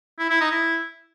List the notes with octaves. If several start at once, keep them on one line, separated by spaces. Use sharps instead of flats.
E4
E4
D#4
E4